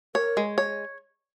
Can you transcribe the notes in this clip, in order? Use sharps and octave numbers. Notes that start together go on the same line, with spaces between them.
A#4 C#5
G#3
C#5